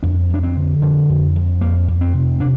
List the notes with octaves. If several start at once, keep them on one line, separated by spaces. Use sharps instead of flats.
F2 D4
F2 D4
C4
D3
D3 F3
F2
F2
F2 A#3
F2
C4
C3
C3 D4